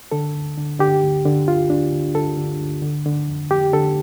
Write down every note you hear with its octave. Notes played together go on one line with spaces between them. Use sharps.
D3 A4
D2
D3
D3 G4
D2
D3
D2 F4
D2 D4
D2
D3 A4
D3
D2
D3
D3
F2
F2 G4
D3 A4